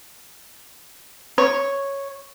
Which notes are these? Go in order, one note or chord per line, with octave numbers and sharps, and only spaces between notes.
C#5